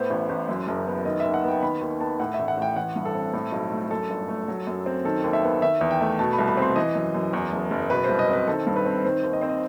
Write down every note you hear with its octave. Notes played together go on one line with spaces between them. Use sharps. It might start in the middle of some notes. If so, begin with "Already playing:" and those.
Already playing: A2 B3 C5
A1
A1
F#2
F#1
B3
D#3 D#5
D#2 E5
F#5
B3 G5
D#3 B5
D#2
B3 A5
A2 F#5
E5
A1
F#5
A1 G5
E3 F#5
G2
A4
C4
A2
B1
A3
F#2 A4
G1
A3
F#3
F#2
C4
D#3 A4
D#2
E5
B3
D#3 E5
E2
G5
A3
B2 A5
B5
C2
B5
C4 C6
E3 D#5
F#2
F#2
E2
F#1
F#1
B2 B4
C2 C5
D#5
C4 B4
D#3 A4
G2
B4
C4
D#3 C5
D#2
D#5
C4 C5
D#5